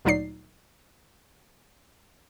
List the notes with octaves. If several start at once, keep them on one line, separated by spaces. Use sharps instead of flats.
D2 A#2 F#3 D#4 D5 C7